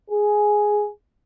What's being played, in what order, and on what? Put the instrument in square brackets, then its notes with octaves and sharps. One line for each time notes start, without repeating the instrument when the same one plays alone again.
[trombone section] G#4